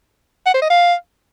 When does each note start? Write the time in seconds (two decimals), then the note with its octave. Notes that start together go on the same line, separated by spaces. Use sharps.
0.46 F#5
0.54 C5
0.62 D#5
0.70 F5